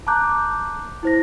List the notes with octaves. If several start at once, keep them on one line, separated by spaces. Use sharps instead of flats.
A5 A#5 D6 F#6 G6
E4 C5 A#6